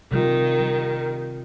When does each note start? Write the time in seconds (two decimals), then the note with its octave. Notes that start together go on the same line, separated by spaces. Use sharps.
0.12 C3 D#3 G3 F4
0.60 G3